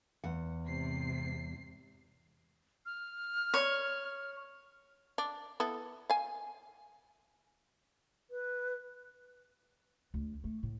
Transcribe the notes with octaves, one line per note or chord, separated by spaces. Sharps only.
E2 F#5
G#2 C3 C7
F6
C#5
D4
B3 E4 A4
F5 G#5
B4
D2
A3
A2